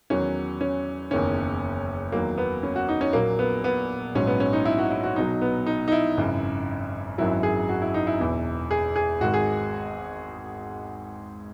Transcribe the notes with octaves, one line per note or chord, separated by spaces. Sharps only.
E2 D#3 F#3 C#4
C#4
F#1 E2 D#3 C#4
E2 D#3 F#3 A#3
B3
C#4
F#4
D#4
C#4
A#1 A#2 F#3 A#3
B3
B3
A#1 G#2 F#3 C#4
B3
C#4
D#4
E4
F#4
E4
F#4
B1 B2 F#3 D#4
B3
D#4
D#4
E4
G#1 F#2 C#3
G#1 F#2 D#3 F#3 E4
G#4
F#4
E4
D#4
E4
E1 E2 B2
G#4
G#4
G#1 G#2 D#3 F#4
G#4